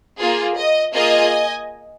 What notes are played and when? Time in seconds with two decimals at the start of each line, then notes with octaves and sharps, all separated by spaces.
0.17 A#3 F4 G#4
0.55 D#5
0.93 A#3 F4 G#4 D#5 G#5